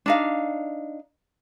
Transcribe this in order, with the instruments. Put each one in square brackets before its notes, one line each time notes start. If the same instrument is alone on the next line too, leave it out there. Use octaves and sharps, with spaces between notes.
[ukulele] D4 D#4 F5